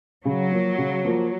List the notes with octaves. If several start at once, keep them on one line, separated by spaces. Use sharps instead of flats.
C#3 F#3
F3 A#3
C#3
F3 A#3